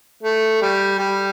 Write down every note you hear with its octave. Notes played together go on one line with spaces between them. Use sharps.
A3
G3
G3